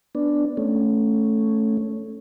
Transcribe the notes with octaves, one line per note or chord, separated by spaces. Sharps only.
B3 D4
A3 C#4